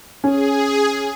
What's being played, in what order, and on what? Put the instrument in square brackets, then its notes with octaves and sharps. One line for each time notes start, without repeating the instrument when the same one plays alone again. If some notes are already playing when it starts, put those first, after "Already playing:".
[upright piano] C#4 [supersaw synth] G#4